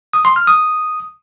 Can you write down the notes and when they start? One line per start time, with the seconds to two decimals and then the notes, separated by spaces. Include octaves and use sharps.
0.13 D#6
0.25 C6
0.36 F6
0.47 D#6